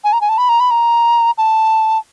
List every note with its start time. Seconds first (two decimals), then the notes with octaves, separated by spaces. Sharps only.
0.04 G#5
0.13 A#5
0.21 G#5
0.29 A5
0.38 B5
0.49 A#5
0.60 B5
0.71 A#5
1.38 A5